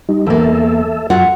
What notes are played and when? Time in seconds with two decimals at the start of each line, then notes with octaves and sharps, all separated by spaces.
0.09 G3 D#4
0.27 E2 A#3 A4 E5
1.10 F#2 F#3 F4 E5 F#5